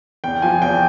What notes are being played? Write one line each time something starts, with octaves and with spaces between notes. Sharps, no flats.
E2 G5
F3 G#5
E2 G5